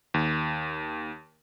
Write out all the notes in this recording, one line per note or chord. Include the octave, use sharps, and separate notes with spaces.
D#2